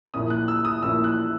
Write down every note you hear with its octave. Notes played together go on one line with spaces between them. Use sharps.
A#1 A#2 A#3 C#4 E4 D#6
F#6
E6
D#6
A#1 A#2 A#3 C#4 E4 E6
F#6